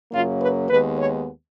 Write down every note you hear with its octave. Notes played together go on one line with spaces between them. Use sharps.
F#2 C#3 F#3 A#3 F4
B4
D#2 D#3 G#3 B3 B4
C#5